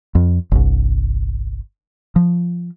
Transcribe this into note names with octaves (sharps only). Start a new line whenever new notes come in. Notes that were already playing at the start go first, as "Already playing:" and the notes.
F2
G1 C2
F3